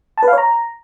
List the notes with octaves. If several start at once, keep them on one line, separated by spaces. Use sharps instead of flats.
A5
B4
F5
C#5
A#5